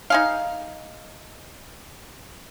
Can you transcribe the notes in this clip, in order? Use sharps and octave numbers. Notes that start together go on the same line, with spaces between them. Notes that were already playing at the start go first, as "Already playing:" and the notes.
D#4 G#4 F5